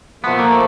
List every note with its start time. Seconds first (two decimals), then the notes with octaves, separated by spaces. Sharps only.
0.23 A#2 F3 A3 B3
0.39 A#3